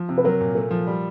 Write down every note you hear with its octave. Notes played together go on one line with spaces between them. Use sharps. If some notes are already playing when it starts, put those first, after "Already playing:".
Already playing: F3
C3
B4
F#3 A#4
A#2
A3 A#4
F3
G3